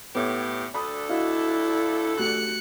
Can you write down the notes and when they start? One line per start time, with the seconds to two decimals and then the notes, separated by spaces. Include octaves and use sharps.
0.15 A2 B3 G4
0.74 D2 D4 A4 B5 D#6
1.10 E4 F#4 D#5 F5
2.19 A3 F#4 G4 F#6 C#7